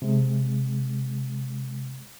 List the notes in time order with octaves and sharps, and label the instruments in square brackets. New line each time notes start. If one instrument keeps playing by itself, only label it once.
[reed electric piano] C3 G#3